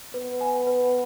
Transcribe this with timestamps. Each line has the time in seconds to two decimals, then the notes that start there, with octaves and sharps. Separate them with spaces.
0.14 B3 B4
0.41 G#5
0.67 B4